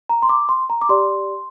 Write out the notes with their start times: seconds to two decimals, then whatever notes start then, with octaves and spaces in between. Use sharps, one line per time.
0.09 A#5
0.22 C6
0.29 D6
0.49 C6
0.70 A#5
0.82 D6
0.89 G4 D5 C6